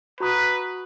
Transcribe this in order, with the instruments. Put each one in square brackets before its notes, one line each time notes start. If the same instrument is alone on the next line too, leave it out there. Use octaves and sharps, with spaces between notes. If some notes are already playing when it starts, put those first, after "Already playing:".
[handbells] F#4 A#5 D#6 [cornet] B4